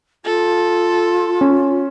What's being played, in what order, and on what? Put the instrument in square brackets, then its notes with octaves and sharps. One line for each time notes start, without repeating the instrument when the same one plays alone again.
[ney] F4 [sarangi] A4
[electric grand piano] C#4